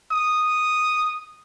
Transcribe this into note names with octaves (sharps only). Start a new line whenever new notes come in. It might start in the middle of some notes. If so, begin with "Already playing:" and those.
D#6